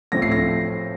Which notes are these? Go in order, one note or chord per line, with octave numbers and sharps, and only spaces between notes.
A2 F3 A3 C4 A#6
C7
A#6